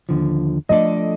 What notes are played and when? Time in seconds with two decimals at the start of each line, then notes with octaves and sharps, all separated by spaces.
0.09 D#2 D3 F3
0.69 F3 A3 D4 A4 D5 D#5